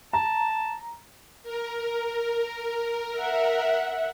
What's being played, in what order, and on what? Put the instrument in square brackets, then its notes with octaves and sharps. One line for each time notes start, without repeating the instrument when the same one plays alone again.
[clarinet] A5 [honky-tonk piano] A#5
[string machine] A#4
[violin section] E5 F#5